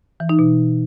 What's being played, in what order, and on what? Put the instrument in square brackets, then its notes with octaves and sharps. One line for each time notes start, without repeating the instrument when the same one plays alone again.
[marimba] E3
D#4
B2